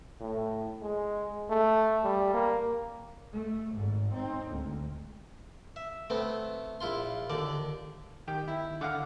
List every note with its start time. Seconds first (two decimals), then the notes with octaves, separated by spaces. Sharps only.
0.21 A2
0.82 G#3
1.50 A3
2.04 G3
2.34 A#3
3.33 A3
3.74 G#1 G#2
4.14 C4 D#4
4.51 D2 G#3
5.76 E5
6.10 A3 B3 C4
6.80 A#1 E4 F4 C6
7.30 D#2 D3 D5
8.28 D#3 G4 G5
8.48 E4
8.81 D3 F5 F#5 D6